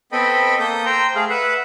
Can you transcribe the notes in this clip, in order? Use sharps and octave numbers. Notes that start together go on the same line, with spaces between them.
B3 C4 A4 D#5 G5 B5
A#3 A4 D#6 G6
C5 G5 A#5
A3 G#4 F5
B4 E5 F#5